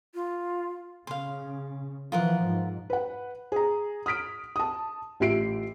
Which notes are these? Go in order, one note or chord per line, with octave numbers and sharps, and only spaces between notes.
F4
C#3 F5 C6
E3 F3 F4 A#4 F#5
G#2
B4 F#5
G#4 A#5
D#6 F6 B6 D7
A5 D#6
A1 F4 G4 E5 C7 D7